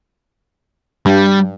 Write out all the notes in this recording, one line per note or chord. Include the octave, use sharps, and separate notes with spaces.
G2 G3